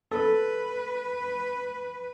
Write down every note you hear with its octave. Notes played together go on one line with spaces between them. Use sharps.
A4 B4